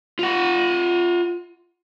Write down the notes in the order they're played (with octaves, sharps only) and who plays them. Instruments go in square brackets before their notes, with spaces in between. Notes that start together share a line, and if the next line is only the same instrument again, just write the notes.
[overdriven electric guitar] F4 F#5